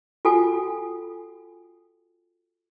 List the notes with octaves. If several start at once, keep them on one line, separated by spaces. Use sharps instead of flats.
F4 F#4 A4 G5 G#5